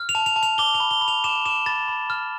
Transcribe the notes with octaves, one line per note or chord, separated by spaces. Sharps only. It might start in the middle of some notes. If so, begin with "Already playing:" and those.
Already playing: F6
F7
A5
F7
A5
F7
D6 G7
F7
B5
G7
B5
F7
D6 E7
D6 E7
B5 A6
B5
F6